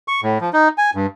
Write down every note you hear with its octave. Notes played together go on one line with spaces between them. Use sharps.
C#6
A2
F3
D#4
G#5
G2